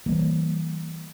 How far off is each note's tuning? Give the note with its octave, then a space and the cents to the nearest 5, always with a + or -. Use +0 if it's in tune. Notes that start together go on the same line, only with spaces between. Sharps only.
E3 -25 G3 -40 A#3 -25